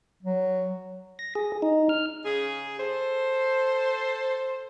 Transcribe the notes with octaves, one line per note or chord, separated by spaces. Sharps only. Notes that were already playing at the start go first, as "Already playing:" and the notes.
F#3
A#6
G#4
D#4
F6
C#3 G#4
A4 C5